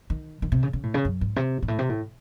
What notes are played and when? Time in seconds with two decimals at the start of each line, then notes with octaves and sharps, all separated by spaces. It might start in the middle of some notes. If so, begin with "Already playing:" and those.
0.10 D#3
0.42 D#3
0.52 C3
0.63 C#3
0.73 C#3
0.83 A2
0.94 C#3
1.05 F#2
1.21 G#2
1.36 C3
1.62 G#2
1.68 A2
1.79 C3
1.89 A2